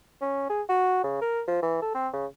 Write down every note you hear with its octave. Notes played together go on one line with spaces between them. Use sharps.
C#4
G#4
F#4
C#3
A#4
F3
E3
A4
C4
C#3